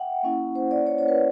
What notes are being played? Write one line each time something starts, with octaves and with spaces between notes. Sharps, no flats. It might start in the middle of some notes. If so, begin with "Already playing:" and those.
Already playing: E5 F#5 G5
A#3 C#4 E4
C5
D5
C#5
C#5
B4